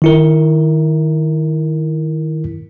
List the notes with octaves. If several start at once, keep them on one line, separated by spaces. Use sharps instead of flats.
D#3 E4 A#4